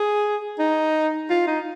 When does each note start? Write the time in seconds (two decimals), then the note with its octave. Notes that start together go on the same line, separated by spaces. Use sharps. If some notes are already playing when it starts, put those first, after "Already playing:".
Already playing: G#4
0.59 D#4
1.30 F4
1.47 D#4